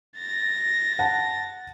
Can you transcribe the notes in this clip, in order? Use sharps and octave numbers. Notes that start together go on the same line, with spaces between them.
A6 A#6
F#5 A5